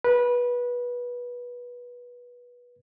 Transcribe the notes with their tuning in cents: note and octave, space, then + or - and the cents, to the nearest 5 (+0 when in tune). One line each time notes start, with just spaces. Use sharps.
B4 -20